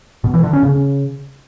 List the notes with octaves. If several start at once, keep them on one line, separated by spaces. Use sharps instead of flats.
B2
E3
D3
C#4
C#3